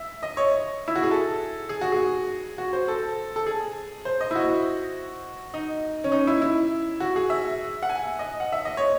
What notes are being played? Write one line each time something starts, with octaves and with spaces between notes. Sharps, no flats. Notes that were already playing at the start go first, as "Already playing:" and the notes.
Already playing: E5
D#5
C#5
E4
F#4
G#4
A4
G#4
F#4
G#4
F#4
C5
A4
A4
G#4
C5
D#5
E4
F#4
D#4
C#4
D#4
E4
E4
F#4
G#4
E5
F#5
G#5
D#5
F#5
E5
D#5
C#5